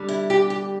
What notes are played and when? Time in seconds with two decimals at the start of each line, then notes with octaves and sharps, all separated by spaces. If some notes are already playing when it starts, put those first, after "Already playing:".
Already playing: D3 G3
0.09 E4
0.30 G4
0.50 G4